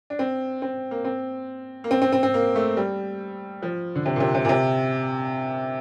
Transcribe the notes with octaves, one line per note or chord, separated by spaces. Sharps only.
D4
C4
C4
A#3
C4
A#3
C4
C4
C4
C4
A#3
A3
G3
F3
D3
C3
A#2
C3
C3
A#2
C3